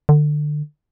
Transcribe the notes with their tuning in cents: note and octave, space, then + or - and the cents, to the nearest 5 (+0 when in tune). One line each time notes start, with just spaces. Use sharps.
D3 +25